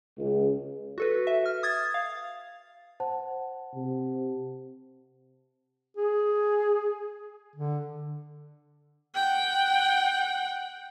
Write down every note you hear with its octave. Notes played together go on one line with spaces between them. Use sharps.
C#2
F#4 A4 B4
E5
F6
D#6 G#6 A6
F5
C5 F#5 A5
C3
G#4
D3
F#5 G5